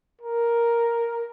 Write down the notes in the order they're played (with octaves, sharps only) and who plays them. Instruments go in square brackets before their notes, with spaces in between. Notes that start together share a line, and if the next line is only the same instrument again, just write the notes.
[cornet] A#4